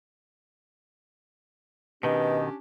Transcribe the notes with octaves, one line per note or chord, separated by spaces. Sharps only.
B2 D#3 B3 C#4 D4 G4 D#5